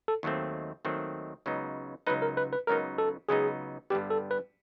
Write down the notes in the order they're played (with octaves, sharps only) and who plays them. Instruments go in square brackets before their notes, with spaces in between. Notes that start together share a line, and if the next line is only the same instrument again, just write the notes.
[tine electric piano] A4
[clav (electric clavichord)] D#2 D#3 F#3 A3 C4
D#2 D#3 F#3 A3 C4
C#2 C#3 F#3 B3 D#4
[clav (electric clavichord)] C#2 C#3 F#3 B3 D#4 [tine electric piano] B4
[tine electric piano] A#4
B4
B4
[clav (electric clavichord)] C#2 C#3 F#3 B3 D#4 [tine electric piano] A#4
[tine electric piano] A4
[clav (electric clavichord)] C#2 C#3 F#3 B3 D#4 [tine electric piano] G#4
[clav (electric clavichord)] G2 D3 G3 B3 [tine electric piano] G4
[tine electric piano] A4
B4